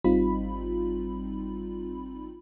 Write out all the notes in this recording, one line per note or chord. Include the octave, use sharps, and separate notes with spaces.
G#1 G3 C4 D#4 F4 B5